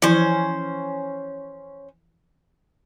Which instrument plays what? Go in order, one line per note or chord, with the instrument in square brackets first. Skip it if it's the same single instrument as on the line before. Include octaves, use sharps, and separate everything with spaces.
[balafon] E3 F3 E4 [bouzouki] C#4 C5